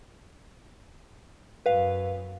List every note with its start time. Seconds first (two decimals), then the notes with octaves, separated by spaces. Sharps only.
1.66 F#2 B4 F5